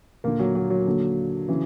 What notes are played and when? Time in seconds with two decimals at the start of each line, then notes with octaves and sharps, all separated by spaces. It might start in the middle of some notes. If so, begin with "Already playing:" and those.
0.24 D#2 A#2 D3 A#3
0.39 F#3
0.55 F#3
0.70 F#3
0.87 D#2 D3
1.49 C#3 E3